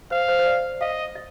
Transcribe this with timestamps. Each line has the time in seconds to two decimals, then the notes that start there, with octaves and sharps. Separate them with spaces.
0.11 C5 F5
0.28 C5
0.39 C5
0.46 D5
0.81 D#5 F5
1.15 D#5